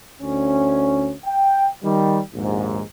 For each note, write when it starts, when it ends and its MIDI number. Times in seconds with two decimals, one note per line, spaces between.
0.21 1.13 38
0.21 1.13 61
1.25 1.67 79
1.83 2.20 51
1.83 2.20 55
2.34 2.81 34
2.34 2.81 39
2.34 2.81 44